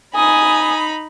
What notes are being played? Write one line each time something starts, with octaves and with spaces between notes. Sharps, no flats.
D#4 G#5 B5 D#6